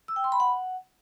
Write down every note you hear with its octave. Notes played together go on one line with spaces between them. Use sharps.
E6
G5
C6
B5
F#5